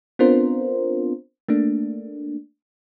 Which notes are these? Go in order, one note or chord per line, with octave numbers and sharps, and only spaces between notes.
B3 C4 D4 F4 A#4 C5
A3 A#3 D4